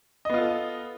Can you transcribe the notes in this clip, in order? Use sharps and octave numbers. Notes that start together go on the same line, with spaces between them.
B3 F4 A4 D#5